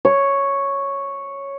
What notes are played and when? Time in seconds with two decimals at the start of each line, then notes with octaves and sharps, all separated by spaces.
0.05 C#5